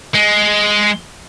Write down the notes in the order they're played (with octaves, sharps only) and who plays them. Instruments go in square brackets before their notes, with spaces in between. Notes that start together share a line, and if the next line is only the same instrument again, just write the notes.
[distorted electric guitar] G#3